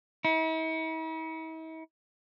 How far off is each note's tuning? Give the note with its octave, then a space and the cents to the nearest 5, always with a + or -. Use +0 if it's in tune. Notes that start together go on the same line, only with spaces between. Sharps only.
E4 -45